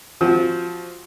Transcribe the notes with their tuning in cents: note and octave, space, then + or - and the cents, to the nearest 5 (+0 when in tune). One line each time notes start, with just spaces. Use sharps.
F3 +0 F#4 +15 E6 -40